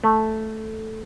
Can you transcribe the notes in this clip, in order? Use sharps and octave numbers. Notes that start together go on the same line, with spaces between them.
A3